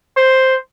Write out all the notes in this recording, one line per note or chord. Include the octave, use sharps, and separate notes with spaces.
C5